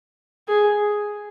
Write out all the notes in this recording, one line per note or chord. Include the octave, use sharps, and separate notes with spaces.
G#4